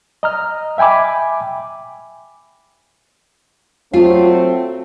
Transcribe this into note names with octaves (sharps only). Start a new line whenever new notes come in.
D#5 A#5 F6
E5 G5 G#5 B5 D6
F#3 A3 C4 F4 F5